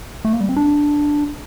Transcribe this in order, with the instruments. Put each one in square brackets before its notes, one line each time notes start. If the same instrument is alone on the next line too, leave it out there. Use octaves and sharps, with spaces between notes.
[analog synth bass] A3
A#3
G3
C4
D4